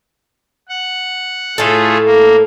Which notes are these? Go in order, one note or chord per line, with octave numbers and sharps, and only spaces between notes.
F#5
A2 A3 F4 G#4 A4
A#3